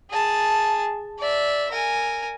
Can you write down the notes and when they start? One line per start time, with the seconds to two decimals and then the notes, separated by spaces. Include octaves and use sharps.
0.10 G#4 A5
1.19 D5 E5
1.71 A#4 G#5